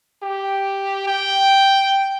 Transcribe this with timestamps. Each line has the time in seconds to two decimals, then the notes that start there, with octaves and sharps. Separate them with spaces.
0.23 G4
1.07 G5